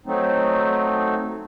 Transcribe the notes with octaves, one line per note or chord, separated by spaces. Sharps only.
F#3 A3 C4 D#4